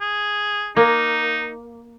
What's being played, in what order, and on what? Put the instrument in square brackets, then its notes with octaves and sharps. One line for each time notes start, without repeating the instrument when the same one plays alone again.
[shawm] G#4
[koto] A#3 [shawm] D#4